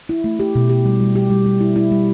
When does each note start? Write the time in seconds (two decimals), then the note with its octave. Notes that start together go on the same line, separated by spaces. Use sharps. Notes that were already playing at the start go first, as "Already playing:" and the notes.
0.09 E4
0.24 A3
0.40 G4
0.55 B2
0.70 G4
0.86 G3
1.00 G3
1.15 G4
1.30 G3
1.46 G3
1.61 E4
1.76 E4
1.91 G3